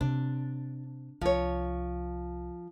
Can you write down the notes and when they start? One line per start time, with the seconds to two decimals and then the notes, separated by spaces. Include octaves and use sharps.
0.01 C3 D4
1.21 C2 F3 C#5